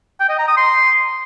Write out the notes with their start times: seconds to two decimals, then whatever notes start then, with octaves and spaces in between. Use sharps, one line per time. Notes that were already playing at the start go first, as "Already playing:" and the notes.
0.20 G5
0.29 D#5
0.39 A#5
0.48 D#6
0.57 C6